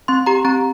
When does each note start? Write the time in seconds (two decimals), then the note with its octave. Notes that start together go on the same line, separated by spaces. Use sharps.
0.08 C4 C6
0.26 G4 A#5
0.45 C4 A#5